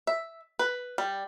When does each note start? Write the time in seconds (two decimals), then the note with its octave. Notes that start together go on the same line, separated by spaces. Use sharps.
0.07 E5
0.59 B4
0.98 G3